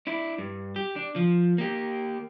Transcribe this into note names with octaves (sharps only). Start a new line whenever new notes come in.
D4 E4
G2
G4
D4
F3
A#3 G4